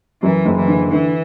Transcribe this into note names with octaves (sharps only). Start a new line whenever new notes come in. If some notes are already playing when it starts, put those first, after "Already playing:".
F#2 E3
F#1
E3
D3
D3 E3